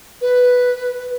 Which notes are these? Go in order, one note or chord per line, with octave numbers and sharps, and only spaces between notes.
B4